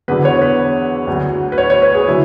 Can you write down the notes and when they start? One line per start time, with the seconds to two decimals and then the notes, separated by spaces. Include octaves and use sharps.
0.08 E2 D3 F#3 B4
0.25 C#5
0.42 B4
1.07 D2 D3 F#3
1.52 B4
1.58 C#5
1.70 C#5
1.82 B4
1.95 G#4
2.07 D3 F#3 E4